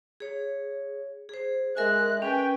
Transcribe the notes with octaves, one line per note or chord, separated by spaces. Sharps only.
G#4 C#5
G#4 C5
G#3 A#4 E5 G#5 F#6
C#4 B4 G5 G#5